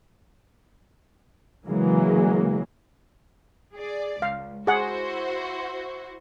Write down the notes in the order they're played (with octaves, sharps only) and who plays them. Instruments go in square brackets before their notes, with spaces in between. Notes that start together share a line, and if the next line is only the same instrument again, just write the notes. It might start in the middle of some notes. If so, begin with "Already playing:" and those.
[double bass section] C#3 E3 F#3 G#3 A#3
[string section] G#4 D5
[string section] C#2 [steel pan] F5
[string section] E4 F#4 C5 [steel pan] G#4 F#5